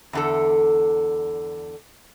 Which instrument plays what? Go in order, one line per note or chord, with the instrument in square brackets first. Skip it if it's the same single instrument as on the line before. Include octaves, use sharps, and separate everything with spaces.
[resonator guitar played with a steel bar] E2 D3 A4